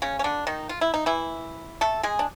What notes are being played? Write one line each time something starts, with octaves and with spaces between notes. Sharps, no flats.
C#3 C#4
C#4
D3 D4
D#3 D#4
F4
E4
D#4
E3 E4
A3 A4
G#3 G#4
D4